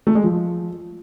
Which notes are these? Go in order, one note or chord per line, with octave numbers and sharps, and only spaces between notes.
A3
G#3
F3